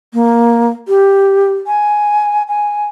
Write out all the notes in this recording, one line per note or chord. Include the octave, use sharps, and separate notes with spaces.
A#3
G4
G#5
G#5